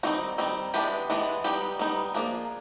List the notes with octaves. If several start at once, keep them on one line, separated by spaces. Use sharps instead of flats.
D#3 G3 C4 D#4 F#4
D#3 G3 C4 D#4
E3 G#3 B3 D4 G4
E3 G#3 B3 D4
G3 B3 D#4 G4
G3 B3 D#4
F3 A#3 D4 G#4